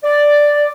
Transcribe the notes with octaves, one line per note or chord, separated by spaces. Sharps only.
D5